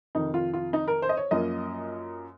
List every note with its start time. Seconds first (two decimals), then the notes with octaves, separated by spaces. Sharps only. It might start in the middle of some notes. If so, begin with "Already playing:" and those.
0.15 F2 C3 D#3 D#4
0.34 F4
0.54 F4
0.73 D#4
0.88 A#4
1.02 C5
1.09 D#5
1.17 C#5
1.31 F#2 F3 A#3 D#5